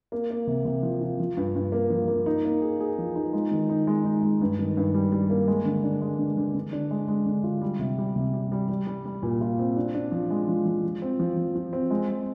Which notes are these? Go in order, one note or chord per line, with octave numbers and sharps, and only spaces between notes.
A#3
A#3
C3
C3
F3
F3
F3
G2
G2
A#3
F3
A#3
D#4
A#3
G#4
G#4
F3
D#4
G#3
D#3
D#4
G#3
D#4
G#3
G2
D#3
G2
G3
G3
A#3
G#3
D3
D4
G#3
D3
D3
D3
D4
G#3
G#3
D3
F4
G3
C3
G3
C3
G3
G3
G3
G3
G3
A#2
F4
C4
D4
D4
F3
G#3
F3
F3
F3
C4
F3
F3
F3
C4
G#3
G#3